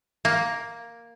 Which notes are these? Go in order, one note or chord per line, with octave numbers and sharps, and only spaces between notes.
A#3